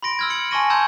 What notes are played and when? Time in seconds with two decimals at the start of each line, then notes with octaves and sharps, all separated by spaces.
0.03 B5 C6 A#6 D7
0.19 E6 F6 G#6
0.30 C#7 F#7
0.51 G#5 A5 C6 C#6 A#6 D#7
0.70 A5 A#5 C6 E6 G6 G#6